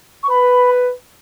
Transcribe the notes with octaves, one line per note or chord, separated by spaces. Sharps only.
C#6
B4 B5